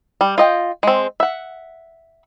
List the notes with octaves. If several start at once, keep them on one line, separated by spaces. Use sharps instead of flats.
G3
F4 D#5 G5
G#3 C4
E5 F#5